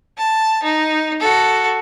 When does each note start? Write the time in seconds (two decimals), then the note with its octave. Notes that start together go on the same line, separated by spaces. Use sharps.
0.18 A5
0.63 D#4
1.20 F#4 A4